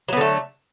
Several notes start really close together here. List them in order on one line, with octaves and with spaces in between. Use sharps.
F#3 B3 D3 A3